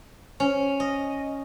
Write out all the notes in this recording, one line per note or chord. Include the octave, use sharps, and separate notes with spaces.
C#4
D#5